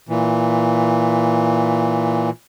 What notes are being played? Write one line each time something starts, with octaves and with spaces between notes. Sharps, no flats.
A#2 E3